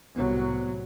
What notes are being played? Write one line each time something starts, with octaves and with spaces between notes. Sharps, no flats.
C2 A2 F#3 B3